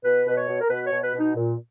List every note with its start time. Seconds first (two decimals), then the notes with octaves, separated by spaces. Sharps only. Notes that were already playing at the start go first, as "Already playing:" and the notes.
0.04 B2 B4
0.26 B2 B4
0.37 C#5
0.48 B2
0.61 A#4
0.70 B2 B4
0.87 B2 C#5
1.04 B4
1.14 B2
1.20 D#4
1.36 A#2